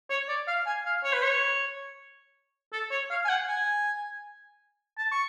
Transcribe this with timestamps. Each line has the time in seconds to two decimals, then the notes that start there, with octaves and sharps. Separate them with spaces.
0.10 C#5
0.28 D5
0.47 F5
0.67 G#5
0.86 F5
1.04 C#5
1.13 B4
1.23 C#5
2.73 A4
2.91 C#5
3.10 F5
3.25 G#5
3.29 F#5
3.48 G#5
4.98 A5
5.11 C#6